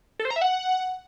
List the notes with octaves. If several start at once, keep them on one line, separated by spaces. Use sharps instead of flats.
A4
C5
A#5
E5
F#5